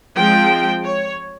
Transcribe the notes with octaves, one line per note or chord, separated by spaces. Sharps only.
F3 G#3 C4 G5
C#5